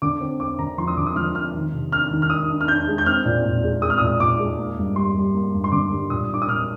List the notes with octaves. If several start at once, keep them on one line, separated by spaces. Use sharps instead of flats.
D3 D6
C4
C4 D6
D3 A#5
F3 C6
D#6
D3 D6
D#6
F3 F6
C4 F6
D#3
C3
D4 F6
D#3
F6
D4 D#6
D4
F6
D4 G6
G#3
G6
C4 F6
A#2
A#2
G#3
G#3 D#6
F6
A#2 D#6
A#2 D6
G#3
A#3
G2
G3 C6
G3
A#3
G2
C6
D3 D6
G3
A#2 D#6
D4 D6
D#6
A#2 F6